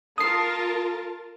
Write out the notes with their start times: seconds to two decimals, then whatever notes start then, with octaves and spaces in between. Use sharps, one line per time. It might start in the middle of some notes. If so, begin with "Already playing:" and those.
0.18 F4 A#4 A5 D#6 C7